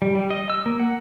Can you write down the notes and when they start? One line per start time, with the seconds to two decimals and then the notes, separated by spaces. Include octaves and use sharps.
0.02 G3
0.15 G3
0.31 D#5
0.50 E6
0.66 A#3
0.80 F#5